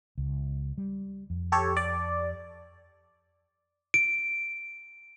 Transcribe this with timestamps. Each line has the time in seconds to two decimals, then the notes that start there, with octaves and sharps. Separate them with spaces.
0.18 C#2
0.78 G3
1.30 F2
1.52 G4 A4 C#5
1.77 D5
3.94 D7